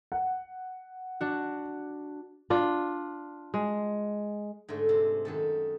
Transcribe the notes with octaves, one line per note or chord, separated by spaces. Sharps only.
F#5
D4 F#4
D4 F4
G#3
G#2 D3 A3
C3
F#2 D#3 A4